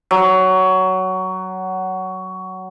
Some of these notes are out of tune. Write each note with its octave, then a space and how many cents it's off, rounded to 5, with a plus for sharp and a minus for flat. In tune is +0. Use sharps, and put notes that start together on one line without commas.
F#3 +15